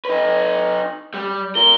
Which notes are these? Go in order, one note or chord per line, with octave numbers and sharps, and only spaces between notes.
D#4 B4
G3
F4 A#4 G7